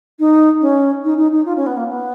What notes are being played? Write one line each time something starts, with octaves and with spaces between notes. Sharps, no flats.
D#4
C#4
D#4
D#4
D#4
F4
C#4
B3
A#3
B3